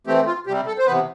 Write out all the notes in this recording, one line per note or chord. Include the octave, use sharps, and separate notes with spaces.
E3 A3 C4 G4
F4
C3 G3 C4 G4
A4
C5
C3 E3 B3 B4